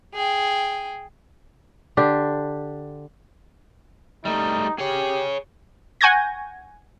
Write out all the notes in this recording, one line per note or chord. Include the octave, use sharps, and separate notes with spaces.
G#4 G5
D3 D4 G4
G3 A3 D#4
G4 G#4 C#5
F#5 G#5 C#6 G6 G#6 A#6